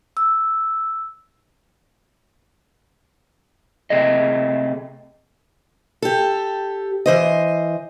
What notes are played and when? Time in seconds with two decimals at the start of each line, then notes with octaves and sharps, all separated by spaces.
0.17 E6
3.90 C3 A3 G#4 D#5
6.02 G4 A4
7.06 E3 C5 D#5